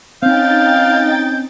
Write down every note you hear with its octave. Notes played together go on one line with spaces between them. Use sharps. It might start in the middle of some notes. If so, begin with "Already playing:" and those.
C4 C#4 D#4 F5 G5 G6 A6